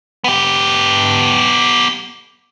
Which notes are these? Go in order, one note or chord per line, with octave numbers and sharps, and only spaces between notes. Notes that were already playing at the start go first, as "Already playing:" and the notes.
B3 G4